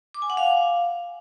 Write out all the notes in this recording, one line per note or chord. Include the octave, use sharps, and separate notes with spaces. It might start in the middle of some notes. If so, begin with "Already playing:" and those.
D6
G#5
F#5
F5